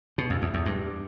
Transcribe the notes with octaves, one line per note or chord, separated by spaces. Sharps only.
B2
F2
E2
E2
G2